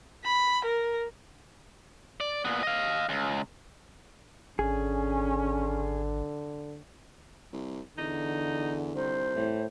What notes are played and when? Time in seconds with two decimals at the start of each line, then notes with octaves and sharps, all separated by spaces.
0.24 B5
0.64 A#4
2.20 D5
2.45 A#2 B3
2.63 D#5 F5
3.09 C#2
4.59 G#1 D3 C#4 G#4
7.53 C2
7.98 E2 D3 D#4
8.95 C2 D#3 C5
9.35 A2 E3